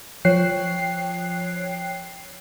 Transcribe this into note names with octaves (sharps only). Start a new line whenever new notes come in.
F3 C#5 G5 F#6 C7